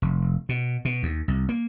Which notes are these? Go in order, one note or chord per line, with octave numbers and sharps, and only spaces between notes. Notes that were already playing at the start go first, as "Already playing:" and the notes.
F1
B2
B2
D#2
C2
A#3